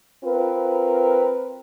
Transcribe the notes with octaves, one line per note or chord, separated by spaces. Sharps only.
C4 F4 A#4 B4